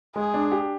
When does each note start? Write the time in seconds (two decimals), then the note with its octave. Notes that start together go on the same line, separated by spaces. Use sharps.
0.16 G#3 G#4
0.34 D4
0.52 G4